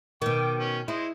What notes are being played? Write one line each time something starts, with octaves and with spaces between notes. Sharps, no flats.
B2 D#3 G5 D6
C#4
G#3 E4 C5